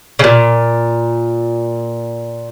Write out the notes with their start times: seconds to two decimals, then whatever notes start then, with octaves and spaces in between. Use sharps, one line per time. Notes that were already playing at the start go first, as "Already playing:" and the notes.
0.19 A#2 C#3